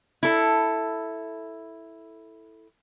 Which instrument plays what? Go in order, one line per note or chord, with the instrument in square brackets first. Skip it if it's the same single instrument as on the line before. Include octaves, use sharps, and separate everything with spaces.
[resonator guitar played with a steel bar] E4 A4